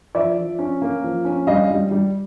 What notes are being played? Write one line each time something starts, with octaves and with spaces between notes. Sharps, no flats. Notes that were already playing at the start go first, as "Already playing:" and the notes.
F3 D5 E5
F3
C#4
A#3
F3
C#4
G3 D#5 F5
G3
G3